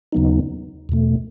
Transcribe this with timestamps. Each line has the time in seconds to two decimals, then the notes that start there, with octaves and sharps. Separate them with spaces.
0.13 D#2 C#3 F#3 B3 D#4
0.89 E2 B2 A3